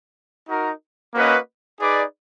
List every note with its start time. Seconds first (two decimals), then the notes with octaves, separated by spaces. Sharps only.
0.48 D#4 F#4 A#4
1.14 A#3 C#4 F#4 B4 D#5
1.81 D#4 G#4 B4 D5